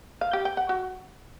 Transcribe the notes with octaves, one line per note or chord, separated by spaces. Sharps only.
F5
G4
G5
F#5
F#4